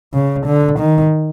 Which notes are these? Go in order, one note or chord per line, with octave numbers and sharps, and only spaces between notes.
C#3
D3
D#3